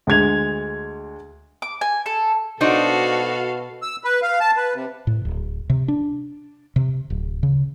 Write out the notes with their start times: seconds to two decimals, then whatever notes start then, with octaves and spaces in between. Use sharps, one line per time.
0.07 D2 G#3 G#6 F7
1.62 D6
1.81 G#5
2.06 A4
2.61 B2 D4 D#4 F#4 A4 C5 F5
3.82 E6
4.04 B4
4.22 F5
4.40 A5
4.57 B4
4.74 C3
5.07 A2
5.25 D1
5.70 C3
5.88 D4
6.76 C3
7.10 D1
7.43 C#3